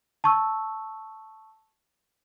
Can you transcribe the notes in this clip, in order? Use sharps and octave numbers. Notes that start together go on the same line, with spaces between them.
A5 C#6 E6